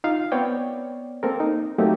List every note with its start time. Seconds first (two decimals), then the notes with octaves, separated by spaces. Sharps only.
0.04 D#4 F4 F5
0.32 B3 C4 C#5 D5 G5
1.23 A#3 C4 A4 A#4
1.40 D#4
1.78 F#3 A3 A#3 C4 D#4 G4